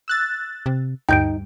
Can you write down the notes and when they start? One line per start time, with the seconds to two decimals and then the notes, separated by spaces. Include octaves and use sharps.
0.08 E6 F#6 A6
0.66 C3
1.09 D2 G2 D#4 G5 G6 D7